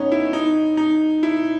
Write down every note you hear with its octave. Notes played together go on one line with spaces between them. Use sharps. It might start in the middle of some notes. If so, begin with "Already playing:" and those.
Already playing: B3 C#4 D#4
E4
D#4
D#4
E4